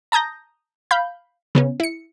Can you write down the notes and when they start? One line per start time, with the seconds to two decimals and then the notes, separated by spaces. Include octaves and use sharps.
0.12 A5 A#5 D#6 G6 A#6
0.91 F5 B5 G6
1.55 C#3 B3 C#4
1.80 E4 C#7